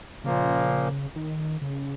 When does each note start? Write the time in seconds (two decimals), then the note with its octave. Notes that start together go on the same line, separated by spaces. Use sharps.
0.24 A#2 C#3 F3 A#3
1.16 D#3
1.62 C#3